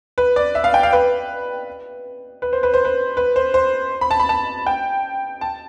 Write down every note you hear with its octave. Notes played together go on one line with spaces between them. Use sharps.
B4
D5
E5
F5
G5
F5
B4
B4
C5
B4
C5
B4
B4
C5
C5
B5
A5
B5
A5
G5
A5